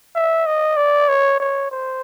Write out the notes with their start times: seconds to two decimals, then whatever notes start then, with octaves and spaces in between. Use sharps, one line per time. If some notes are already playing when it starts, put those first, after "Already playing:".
0.15 E5
0.46 D#5
0.77 D5
1.09 C#5
1.40 C#5
1.71 C5